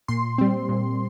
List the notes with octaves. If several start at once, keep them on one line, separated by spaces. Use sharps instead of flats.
A#2 C6
G3 C4
A#2